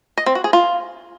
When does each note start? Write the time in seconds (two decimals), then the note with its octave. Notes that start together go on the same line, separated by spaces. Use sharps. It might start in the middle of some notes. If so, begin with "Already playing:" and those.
0.18 D#5
0.26 C4
0.35 F#4
0.44 G#4
0.53 F4